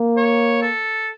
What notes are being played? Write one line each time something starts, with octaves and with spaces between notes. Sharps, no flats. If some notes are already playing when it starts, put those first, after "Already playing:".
Already playing: A#3
C#5
A4